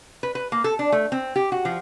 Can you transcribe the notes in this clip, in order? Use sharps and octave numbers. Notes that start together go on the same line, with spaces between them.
B4
B4
A#3
A4
D4
A3
C4
G4
F#4
F3